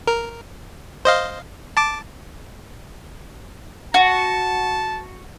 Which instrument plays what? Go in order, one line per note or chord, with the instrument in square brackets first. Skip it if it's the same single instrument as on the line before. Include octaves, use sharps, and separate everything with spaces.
[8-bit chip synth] A#4
C5 D#5 F5
A5 D6
[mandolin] F#4 [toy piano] F#5 [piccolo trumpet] A5